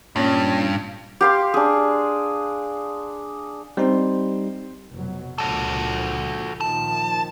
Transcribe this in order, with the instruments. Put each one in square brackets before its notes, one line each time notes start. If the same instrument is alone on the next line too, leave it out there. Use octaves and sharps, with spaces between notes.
[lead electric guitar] G2 [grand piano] A#2 C#4
[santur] G4 F5 C6
D4 G#4
[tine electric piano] G3 D#4 [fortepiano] C4
[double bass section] F1 B2 F#3
[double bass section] C#2 A#2 F3 [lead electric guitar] F#4 A4
[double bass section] A#2 D#3 F3 [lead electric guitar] A5